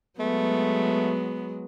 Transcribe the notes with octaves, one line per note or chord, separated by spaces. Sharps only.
F#3 G#3 A3 B3